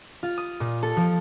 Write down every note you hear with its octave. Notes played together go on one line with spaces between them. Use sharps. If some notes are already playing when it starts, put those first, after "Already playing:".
F4
D#6
A#2
A4
F3